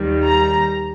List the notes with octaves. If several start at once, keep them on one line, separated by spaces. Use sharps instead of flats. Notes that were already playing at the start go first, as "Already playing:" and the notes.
Already playing: D#2 D#3 G3
A#5